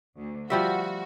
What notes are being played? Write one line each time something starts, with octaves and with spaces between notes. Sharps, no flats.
D2
F3 G3 F#4 E5